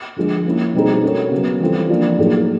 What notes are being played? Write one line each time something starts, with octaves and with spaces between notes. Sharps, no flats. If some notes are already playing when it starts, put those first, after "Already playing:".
D3 F3 G#3
A#3 C#4 E4
B2 G3 C4 D#4 G#4
A3 C#4 F#4 A#4 C#5
C#3 F#3 B3
E3 G3 C4 F4 A4
F3 A#3 D4 F4
A2 F#3 A#3 D#4 G#4